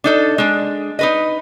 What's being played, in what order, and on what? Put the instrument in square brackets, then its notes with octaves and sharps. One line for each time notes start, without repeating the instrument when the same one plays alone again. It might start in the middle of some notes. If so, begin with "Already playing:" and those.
[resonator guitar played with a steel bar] D4 D#4 A4
G#3 D4
D#4 B4 D#5